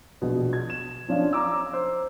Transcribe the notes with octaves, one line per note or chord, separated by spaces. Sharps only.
A#1 B2
G#6
E7
F3 C#4 D4 F4 D5
A#5 D6 E6
C5